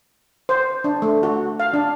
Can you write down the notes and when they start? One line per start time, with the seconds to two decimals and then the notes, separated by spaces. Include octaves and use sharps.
0.49 C5
0.84 D4
1.02 A3
1.23 F#4
1.60 F5
1.73 D4